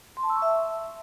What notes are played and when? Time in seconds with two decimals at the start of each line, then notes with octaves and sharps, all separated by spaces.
0.17 C6
0.23 A5
0.30 E6
0.36 C#6
0.42 E5